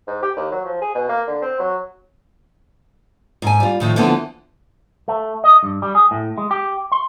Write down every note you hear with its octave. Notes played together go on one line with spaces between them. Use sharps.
G#2
G4
D#2
F#3
F3
G#4
B2
A#3
D3
C4
F#3
G#2 G#5
G3 F4
A2 D#3 F3
D3 E3 F3 B3 A4
A3
D#5
G2
G3
G#4
A2
G#3
G4
C6